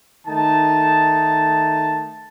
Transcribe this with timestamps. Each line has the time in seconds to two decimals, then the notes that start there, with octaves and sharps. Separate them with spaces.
0.25 D#3 A3 D#4 A5